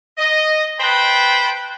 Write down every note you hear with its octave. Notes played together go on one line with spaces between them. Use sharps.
D#5
B4 C5 G5 A5 B5